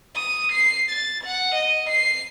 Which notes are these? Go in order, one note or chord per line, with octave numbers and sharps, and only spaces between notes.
D#6
C7
A6
F#5
D#5
C7